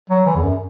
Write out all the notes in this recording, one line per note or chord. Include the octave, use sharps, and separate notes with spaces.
F#3
E3
E2
F#2